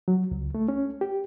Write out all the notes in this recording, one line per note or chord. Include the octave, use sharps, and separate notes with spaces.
F#3
C#2
A3
C#4
G4